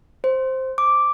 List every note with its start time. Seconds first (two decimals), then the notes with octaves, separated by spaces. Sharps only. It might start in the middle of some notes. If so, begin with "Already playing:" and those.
0.24 C5
0.78 D6